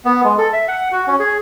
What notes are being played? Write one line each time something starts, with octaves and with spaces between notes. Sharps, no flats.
B3
G#3
A4
E5
F#5
F#4
C#4
G#4